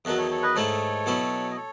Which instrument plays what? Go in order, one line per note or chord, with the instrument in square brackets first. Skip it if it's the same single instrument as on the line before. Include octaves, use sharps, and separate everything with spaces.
[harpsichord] E2 D#3 F#3 [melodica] F#4 A4
[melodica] A4 C#5
A4 C#5
B4 D#5
[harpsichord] G#2 D#3 A3 E4 [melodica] A4 C#5
[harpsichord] B2 F#3 C#4 E4
[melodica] D#5
A4 C#5